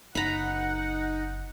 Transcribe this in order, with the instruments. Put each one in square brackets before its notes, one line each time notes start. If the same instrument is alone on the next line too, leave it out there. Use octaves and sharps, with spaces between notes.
[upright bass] F#1 [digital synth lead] D#4 [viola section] F#5 [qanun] A#5 B5